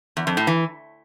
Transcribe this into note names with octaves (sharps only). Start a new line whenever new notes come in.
E2
F2
A2
E3